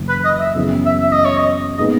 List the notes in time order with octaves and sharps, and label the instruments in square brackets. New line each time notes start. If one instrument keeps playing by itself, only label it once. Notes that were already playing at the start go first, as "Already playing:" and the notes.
Already playing: [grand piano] F#1 F#2 E3
[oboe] B4
D#5
E5
[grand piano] F#2 C#3 E3 B3 E4
[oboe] E5
E5
D#5
C#5
D#5
[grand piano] A#2 G#3 B3 D#4 [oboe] D#5